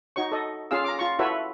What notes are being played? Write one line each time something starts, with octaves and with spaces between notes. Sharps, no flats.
D#4 F#4 C#5 C#6
A4 D#5
C#4 F4 G#4 F5 E6
A#5 D6
F4 C#6
E4 F#4 A4 B4 C#5 E5